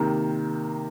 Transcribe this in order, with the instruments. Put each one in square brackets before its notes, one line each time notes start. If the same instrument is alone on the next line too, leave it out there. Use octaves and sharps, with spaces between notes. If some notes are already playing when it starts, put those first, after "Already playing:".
Already playing: [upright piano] C3 D#3 A#3